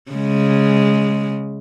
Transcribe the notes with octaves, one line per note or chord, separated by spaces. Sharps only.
C#3 G#3